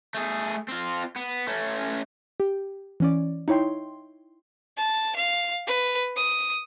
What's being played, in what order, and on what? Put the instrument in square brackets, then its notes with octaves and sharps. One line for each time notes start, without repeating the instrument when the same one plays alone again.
[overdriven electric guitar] A3 G#4
C4 F4
B3
A3 C#4
[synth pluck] G4
E3 C#4 D5
D#4 E4 C#5 G5 C6
[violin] A5
F5
B4
D#6